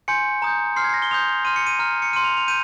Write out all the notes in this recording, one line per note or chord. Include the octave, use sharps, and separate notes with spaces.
G#5 C6 G6 C#7
A#5 D#6 G6
C6 F6 C7
G#6
C7
A#6
G7
C6 D#6 G6 F7
C6 F6 D#7
C#7
D#7
A#5 F6
C#7
C6 F6 D#7
F7
F7
G6 D#7